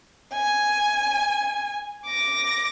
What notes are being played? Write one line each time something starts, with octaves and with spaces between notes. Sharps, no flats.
G#5
D6 A#6